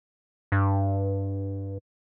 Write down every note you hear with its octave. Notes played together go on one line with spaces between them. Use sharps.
G2